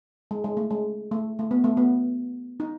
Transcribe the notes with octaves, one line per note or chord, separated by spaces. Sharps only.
G#3
G#3
A3
G#3
A3
A3
B3
A3
B3
D#4